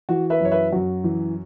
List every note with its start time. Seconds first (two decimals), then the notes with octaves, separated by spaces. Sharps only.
0.09 E3 F#4
0.30 B4 E5
0.41 F#2 C#5
0.51 B4 E5
0.72 F#2 F#4
1.04 E3